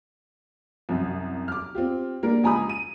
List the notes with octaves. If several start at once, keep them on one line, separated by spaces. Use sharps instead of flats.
C2 F#2
D6 F6
C4 F4 G4
G3 A#3 D4 A#4
C#2 G#5 A#5 B5 D#6
D#7